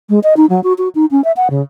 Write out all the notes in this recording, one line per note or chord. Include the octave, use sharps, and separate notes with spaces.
G#3
D#5
D#4
F#3
F#4
F#4
D#4
C#4
E5
F#5
C#3